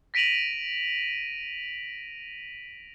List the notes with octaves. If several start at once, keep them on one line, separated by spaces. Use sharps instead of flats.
A#6 B6 D7 D#7 F7 F#7